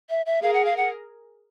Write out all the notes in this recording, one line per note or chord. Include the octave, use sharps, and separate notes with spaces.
E5
E5
G#4 A#4 F5
F#5
F5
F#5